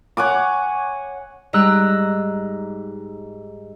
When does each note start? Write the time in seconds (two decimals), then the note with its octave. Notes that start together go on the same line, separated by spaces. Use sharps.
0.17 C#5 F#5 G#5 D6
1.53 G#2 G3 D#4 A#5 E6 F#6